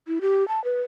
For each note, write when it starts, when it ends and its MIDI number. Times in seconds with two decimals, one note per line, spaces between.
0.07 0.19 64
0.21 0.47 67
0.48 0.62 81
0.64 0.82 71